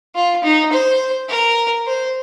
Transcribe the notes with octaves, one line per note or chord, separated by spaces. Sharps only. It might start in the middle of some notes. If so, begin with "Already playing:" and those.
F4
D#4
C5
A#4
C5